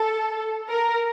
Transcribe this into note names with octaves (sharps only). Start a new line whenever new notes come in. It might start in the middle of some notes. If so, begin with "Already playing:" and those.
Already playing: A4
A#4